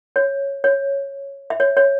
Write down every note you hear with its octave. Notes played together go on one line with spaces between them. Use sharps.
C#5
C#5
E5
C#5
C#5